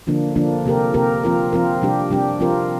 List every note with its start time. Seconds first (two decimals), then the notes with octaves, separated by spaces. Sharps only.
0.07 D3 F3 A#3 D4
0.36 D3 F3 A#3 D4
0.65 C3 A#3 G4 A#4
0.94 C3 A#3 G4 A#4
1.23 F3 C4 F4 A#4
1.52 F3 C4 F4 A#4
1.82 C3 G3 D4 G4
2.10 C3 G3 D4 G4
2.40 F3 C4 F4 A#4